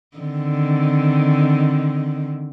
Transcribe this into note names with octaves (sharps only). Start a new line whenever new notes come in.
D3 D#3 C4